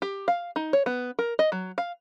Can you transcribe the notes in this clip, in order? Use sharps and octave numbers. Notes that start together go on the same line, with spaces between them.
G4
F5
D#4
C#5
B3
A#4
D#5
F#3
F5